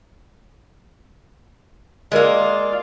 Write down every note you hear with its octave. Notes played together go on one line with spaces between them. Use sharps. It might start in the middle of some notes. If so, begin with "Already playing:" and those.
G#3 A#3 F4 A#4 D5 D#5